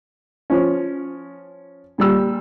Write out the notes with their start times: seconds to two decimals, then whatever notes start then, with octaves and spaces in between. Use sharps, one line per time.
0.50 F3 C#4
1.98 A#2 G3 E6